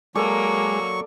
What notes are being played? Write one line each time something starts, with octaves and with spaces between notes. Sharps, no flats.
F#3 G#3 A#3 A4 A#4 D5 C#6